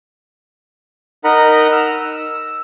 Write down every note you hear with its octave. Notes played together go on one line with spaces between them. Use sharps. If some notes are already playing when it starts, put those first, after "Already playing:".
D#4 A#4 D#5 F#5 A#5 B5
E6 F6
E6